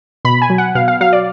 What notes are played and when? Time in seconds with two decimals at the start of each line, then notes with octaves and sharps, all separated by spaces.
0.25 B2 B5
0.42 G#5
0.50 F#3
0.58 F#5
0.75 B2 F5
0.88 F5
1.01 F#3 F5
1.13 D5